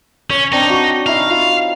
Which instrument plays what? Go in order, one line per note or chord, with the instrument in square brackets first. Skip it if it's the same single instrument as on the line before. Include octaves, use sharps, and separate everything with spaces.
[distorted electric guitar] C#4 [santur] C#5
[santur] C4 D4 [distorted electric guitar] D#4
[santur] F#4
[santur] D#4 E4 [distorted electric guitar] F5
[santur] F4